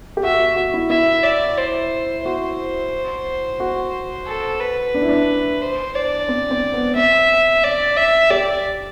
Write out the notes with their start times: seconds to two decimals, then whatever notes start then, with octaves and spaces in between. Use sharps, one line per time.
0.17 G4
0.23 F#4 E5
0.40 F#4
0.56 F#4
0.74 E4
0.90 E4 E5
1.23 D5
1.57 C5
2.24 F#4 C5
3.60 F#4
4.27 A4
4.60 B4
4.94 D4
5.02 E4
5.09 D4
5.62 C5
5.95 D5
6.29 C4
6.51 C4
6.73 B3
6.96 C4 E5
7.64 D5
7.97 E5
8.30 G4 D5